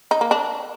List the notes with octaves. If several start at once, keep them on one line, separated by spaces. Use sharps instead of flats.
D#4
A#3
D4